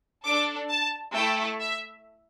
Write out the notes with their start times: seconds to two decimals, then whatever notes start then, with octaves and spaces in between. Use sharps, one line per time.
0.25 D4 A4 D6
0.70 A5
1.15 A3 E4 A4 G5
1.60 E5